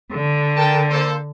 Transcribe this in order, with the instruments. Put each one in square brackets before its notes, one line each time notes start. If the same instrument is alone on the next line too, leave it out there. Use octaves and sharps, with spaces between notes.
[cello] D3
[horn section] A#4 G5 A5
A#3 A4 C5